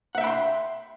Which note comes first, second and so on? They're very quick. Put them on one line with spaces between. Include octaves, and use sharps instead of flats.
F#5 E5 G5 B5 C6